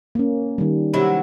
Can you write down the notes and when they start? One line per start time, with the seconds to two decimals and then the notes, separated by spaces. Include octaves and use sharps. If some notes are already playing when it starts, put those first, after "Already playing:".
0.15 A#3 C#4
0.58 D#3 G3
0.93 C3 F#3 E4